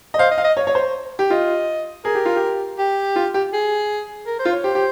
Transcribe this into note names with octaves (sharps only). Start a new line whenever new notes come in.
D#5
C5 F5
D#5
F5
D#5
C#5
C#5
C5
G4
F4 D#5
G#4 A#4
G4
F4
G4
G4
F4
G4
G#4
A#4
C5
F4
C#5
G4 C5
G4